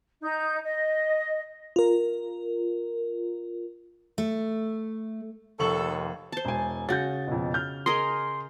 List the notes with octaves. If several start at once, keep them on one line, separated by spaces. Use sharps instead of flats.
D#4 G6
D#5
F4 A#4
A3
F1 D#2 A4 C#6 F#7
C5 A5
E1 G#5
C#3 F#4 G6 A6
F2 B2
F6 G6
G#4 A#4 D#5 C6